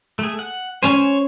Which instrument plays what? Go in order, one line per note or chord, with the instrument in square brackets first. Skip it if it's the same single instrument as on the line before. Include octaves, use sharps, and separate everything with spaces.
[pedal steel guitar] A3 G#4
F#5
[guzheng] C#4 G#5 [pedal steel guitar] C5 C#5